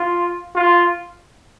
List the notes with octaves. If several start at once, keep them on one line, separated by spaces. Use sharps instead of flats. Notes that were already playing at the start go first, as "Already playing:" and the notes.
Already playing: F4
F4